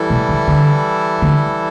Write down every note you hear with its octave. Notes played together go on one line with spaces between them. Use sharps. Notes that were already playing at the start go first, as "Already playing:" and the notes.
Already playing: E3 G3 E4 A4
B2
D3
D3
D3